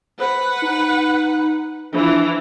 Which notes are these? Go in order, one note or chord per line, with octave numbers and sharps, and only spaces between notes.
B4 C5 F#5
D#4
E3 F3 D4